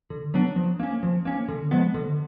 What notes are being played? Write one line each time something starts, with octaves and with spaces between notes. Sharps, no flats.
D3
F#3 B3 D4
F3
A#3 C#4
F3
A#3 C#4
D3
F3 G#3 B3
D3